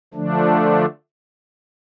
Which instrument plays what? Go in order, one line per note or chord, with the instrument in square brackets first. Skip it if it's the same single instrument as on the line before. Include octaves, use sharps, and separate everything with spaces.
[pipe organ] D3 F3 A3 D4